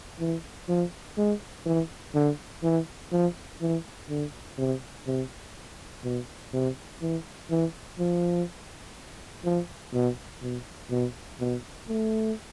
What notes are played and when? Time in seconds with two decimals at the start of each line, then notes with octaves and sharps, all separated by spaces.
0.20 E3
0.69 F3
1.18 G#3
1.66 E3
2.15 D3
2.63 E3
3.12 F3
3.61 E3
4.09 D3
4.58 C3
5.07 C3
6.04 B2
6.53 C3
7.02 E3
7.50 E3
7.99 F3
9.45 F3
9.94 B2
10.42 B2
10.90 B2
11.40 B2
11.88 A3